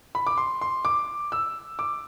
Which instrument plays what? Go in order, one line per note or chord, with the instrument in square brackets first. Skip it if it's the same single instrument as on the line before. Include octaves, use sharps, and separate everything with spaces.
[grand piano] B5
D6
C6
C6
D6
E6
D6